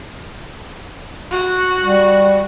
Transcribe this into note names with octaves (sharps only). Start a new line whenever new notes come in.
F#4
G3